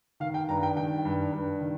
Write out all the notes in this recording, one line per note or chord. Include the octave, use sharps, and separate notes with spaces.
D#3 F5
G5
G2 A#5
G5
D#3 G5
G2
G2
D#3